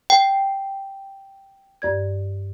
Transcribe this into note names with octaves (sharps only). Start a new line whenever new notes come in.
G5
G2 D5 G#6